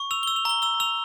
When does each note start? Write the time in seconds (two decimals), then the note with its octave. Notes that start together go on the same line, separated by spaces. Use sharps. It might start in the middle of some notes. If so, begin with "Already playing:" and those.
Already playing: C#6
0.11 E6 F7
0.23 G7
0.27 E6
0.36 F7
0.45 A#5 G7
0.62 E6 G7
0.80 E6 F7